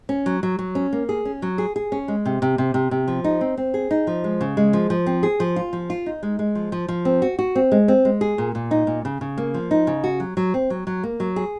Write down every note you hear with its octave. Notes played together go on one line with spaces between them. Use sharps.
C#4
F#3
F#3
F#3
C#4
A#3
G#4
C#4
F#3
G#4
G#4
C#4
G#3
C3
C3
C3
C3
C3
F3
D#4
C4
C4
G#4
D#4
F3
G#3
C#3
G#3
F3
F3
C4
G#4
F3
F4
F3
F4
D#4
G#3
G#3
F3
F3
F3
C4
F#4
F#4
C4
G#3
C4
G#3
G#4
A#2
A#2
D#4
A#2
C#3
C#3
A#3
F3
D#4
C#3
F#4
F#3
F#3
C4
F#3
F#3
A#3
F#3
G#4